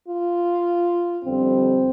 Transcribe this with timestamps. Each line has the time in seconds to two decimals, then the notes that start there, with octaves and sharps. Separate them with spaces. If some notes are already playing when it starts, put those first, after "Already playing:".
0.09 F4
1.24 F2 D3 G3 C4